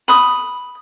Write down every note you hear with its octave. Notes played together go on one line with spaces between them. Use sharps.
B5 D#6